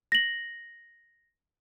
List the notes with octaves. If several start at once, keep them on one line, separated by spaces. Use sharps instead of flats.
A#6 F#7